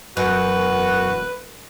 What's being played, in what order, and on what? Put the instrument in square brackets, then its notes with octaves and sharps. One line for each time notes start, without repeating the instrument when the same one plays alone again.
[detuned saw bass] E1 [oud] F#2 [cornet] F#4 [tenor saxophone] B4